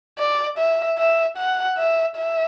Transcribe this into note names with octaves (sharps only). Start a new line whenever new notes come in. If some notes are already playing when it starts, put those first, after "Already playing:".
D5
E5
E5
F#5
E5
E5